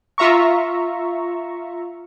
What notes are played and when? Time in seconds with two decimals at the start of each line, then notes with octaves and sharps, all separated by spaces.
0.18 F4 E5 A#5 C#6